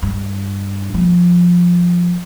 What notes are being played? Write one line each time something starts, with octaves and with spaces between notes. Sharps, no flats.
G2
F3